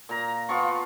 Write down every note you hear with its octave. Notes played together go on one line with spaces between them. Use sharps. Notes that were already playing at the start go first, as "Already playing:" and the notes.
A#2 A#5
B3 F4 A5 C#6